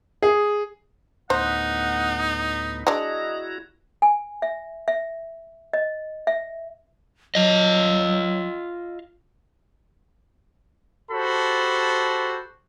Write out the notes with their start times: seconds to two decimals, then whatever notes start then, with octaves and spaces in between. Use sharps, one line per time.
0.22 G#4
1.30 D2 A2 B3 D#4 C5 F#5
2.87 G#3 D4 E4 F#4 D#5 A#5
4.02 G#5
4.42 E5
4.88 E5
5.73 D#5
6.27 E5
7.35 F#3 F4 D#5
11.11 F#4 G4 A4 C5 A5 B5